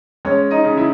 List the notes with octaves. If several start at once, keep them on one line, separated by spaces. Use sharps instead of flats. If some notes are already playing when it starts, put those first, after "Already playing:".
G#3 C#4 C#5
D#4 D#5
C#3
E4 E5